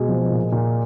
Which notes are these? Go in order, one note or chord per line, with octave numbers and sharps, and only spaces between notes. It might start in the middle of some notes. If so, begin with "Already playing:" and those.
Already playing: B2 G#3 G#4
F3
A#2
A#2